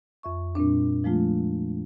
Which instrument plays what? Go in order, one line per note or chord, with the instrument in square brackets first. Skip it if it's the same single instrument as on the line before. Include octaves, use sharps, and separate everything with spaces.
[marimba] F2 E5 C#6
A#2 G3 C4 D4
F3 G#3 A3 F4